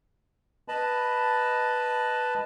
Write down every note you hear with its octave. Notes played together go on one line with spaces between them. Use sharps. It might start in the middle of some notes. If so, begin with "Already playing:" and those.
B4 D#5 A5 B5